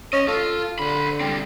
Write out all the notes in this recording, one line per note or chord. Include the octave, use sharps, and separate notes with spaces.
C#4 D#5
F4 A4
D3 C5 B5
G3 C4